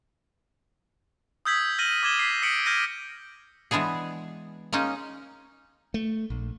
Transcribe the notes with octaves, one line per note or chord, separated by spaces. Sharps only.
D#6 E6 G6 G#6 B6 F#7
F6 A#6 D#7 F#7 G7
D6 D#6 G#6 E7 G7
B6 C7
D#6 A#6 B6 C#7 D7 F#7
F6 G6 G#6 A#6 D#7
E3 G#3 B3 D4 G#4
G#3 A#3 C#4 D#4
A3
A#1